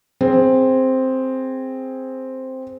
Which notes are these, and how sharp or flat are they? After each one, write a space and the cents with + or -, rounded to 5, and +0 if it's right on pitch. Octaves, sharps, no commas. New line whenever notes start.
C4 +0 G#4 +0